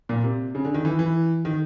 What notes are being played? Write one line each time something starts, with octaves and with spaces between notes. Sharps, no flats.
A#2
C3
C#3
D3
D#3
E3
E3
D#3